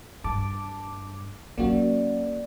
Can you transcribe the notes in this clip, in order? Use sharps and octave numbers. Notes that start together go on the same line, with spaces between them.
G2 A5 D6
F#3 A#3 C#4 F#4 D5